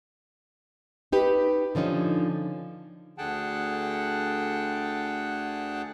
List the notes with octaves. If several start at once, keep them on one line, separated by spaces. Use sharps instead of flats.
D#4 G4 B4
D3 F3 C#4 D#4
D2 D3 G#4 F#5 G5 A5